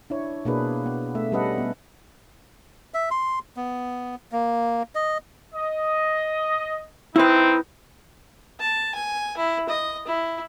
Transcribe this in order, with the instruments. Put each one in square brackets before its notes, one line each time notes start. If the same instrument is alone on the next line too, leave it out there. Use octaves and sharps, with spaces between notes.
[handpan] D4 E4 C#5
B2 A#3 D4 G#4 B4
B3
A3 E5
G3 C#4 A4 B4 D#5 F#5
B3
[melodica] E5
C6
B3
A#3
D#5
[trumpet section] D#5
[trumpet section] C4 D#4 [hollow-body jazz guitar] E4 B4
[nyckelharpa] A5
G#5
E4
D#5
E4